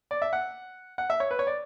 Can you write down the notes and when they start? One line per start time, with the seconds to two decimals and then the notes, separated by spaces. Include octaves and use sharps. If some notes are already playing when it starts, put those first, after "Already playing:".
0.11 D5
0.22 E5
0.33 F#5
0.98 F#5
1.10 E5
1.20 C#5
1.31 B4
1.39 C#5
1.47 D5